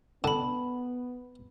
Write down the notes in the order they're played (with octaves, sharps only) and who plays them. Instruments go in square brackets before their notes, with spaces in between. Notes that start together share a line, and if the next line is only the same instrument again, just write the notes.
[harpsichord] D3 [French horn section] B3 [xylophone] A5 B5